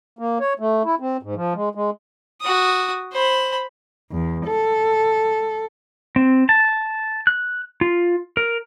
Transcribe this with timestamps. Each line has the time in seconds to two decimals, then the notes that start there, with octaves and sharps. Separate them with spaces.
0.19 A#3
0.40 C#5
0.60 A3
0.85 E4
1.00 C4
1.23 G#2
1.35 F3
1.54 G#3
1.75 G#3
2.41 F#4 D#6
3.12 C5 B5
4.11 E2
4.46 A4
6.16 C4
6.49 A5
7.27 F#6
7.81 F4
8.37 A#4